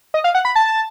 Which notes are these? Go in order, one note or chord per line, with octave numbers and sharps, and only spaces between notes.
D#5
F5
F#5
B5
A5